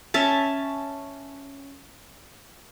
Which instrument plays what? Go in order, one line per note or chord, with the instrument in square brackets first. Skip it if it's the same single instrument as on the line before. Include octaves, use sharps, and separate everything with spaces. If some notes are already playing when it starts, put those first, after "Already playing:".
[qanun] C#4 E5 A5